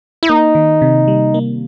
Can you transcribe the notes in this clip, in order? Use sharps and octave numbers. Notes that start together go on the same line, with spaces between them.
E4
A#3 D#4
D#3
C3
G3
A#3